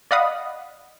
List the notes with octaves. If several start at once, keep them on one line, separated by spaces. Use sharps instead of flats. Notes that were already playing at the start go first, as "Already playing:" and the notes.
D5 D#5 F5 F#5 B5 D#6